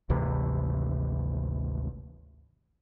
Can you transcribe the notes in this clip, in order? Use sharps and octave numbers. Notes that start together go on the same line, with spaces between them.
G#1 D2 C3 E3